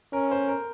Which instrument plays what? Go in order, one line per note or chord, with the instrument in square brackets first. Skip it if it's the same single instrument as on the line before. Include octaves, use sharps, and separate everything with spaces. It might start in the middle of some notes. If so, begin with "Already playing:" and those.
[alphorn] C#4 [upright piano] A#4
[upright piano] C5
A#4